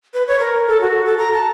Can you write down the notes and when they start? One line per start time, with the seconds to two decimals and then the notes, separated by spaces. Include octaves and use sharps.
0.14 B4
0.27 C#5
0.40 A#4
0.67 A4
0.81 F#4
1.05 A4
1.18 A#5
1.33 A5